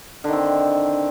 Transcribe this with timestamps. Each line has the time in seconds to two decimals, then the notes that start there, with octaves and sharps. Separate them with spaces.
0.24 D3
0.28 D#3
0.33 C4